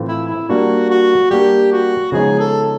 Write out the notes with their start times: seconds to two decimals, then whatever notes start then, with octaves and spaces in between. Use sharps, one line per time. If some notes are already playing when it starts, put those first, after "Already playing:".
Already playing: A2 E3 A3 C4 F4
0.08 E4
0.29 E4
0.49 G3 A#3 D4 F#4
0.90 F#4
1.31 G3 A#3 D4 G4
1.72 F#4
2.12 C#3 F3 G#3 B3 D#4 G#4
2.39 A4